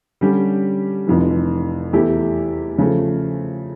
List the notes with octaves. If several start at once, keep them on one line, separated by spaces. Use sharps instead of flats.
D3 G3 C#4 G4
F1 F2 E3
E2 E3 A3 E4 G4
C#3 F3 A3